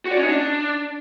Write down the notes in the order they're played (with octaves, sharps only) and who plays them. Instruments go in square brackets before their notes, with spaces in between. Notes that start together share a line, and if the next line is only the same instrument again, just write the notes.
[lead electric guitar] F#4
D5
C#4
D#4
D4